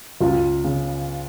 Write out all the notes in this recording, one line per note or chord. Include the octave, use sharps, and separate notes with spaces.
C#2 F4
C#3